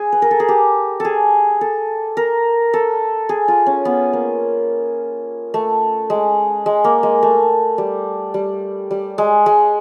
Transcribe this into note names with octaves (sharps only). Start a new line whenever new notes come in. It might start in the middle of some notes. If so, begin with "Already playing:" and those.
Already playing: G#4
B4
A#4
A4
G#4
G4
G#4 A4
A4
A#4
A4
G#4
F4
C#4
B3
A#3
A3
G#3
G#3
A#3
G#3
A3
G3
G3
G3
G#3
G#3